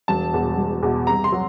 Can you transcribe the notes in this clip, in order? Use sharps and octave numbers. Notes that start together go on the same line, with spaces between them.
E1 A5
E2 B2
E1
E2 B2
C2 A#5
C6
F#3